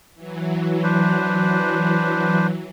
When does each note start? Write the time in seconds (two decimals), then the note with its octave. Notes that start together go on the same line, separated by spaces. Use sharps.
0.15 E3 F#3
0.83 D4 B4 C5